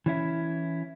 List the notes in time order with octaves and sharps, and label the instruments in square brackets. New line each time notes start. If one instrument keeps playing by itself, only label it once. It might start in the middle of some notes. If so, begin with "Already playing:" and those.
[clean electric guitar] E3 C#4 E4